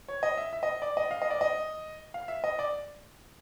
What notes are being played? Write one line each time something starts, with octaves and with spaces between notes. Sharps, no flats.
C#5
D#5
E5
E5
D#5
D5
D#5
F5
D#5
D5
D#5
F5
E5
D#5
D5